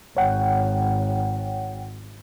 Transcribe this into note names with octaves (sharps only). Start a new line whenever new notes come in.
G#1 C#5 F#5 G5